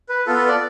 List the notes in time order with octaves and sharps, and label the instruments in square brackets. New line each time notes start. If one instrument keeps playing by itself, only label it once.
[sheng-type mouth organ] B4
B3 F4 A4
B4
D5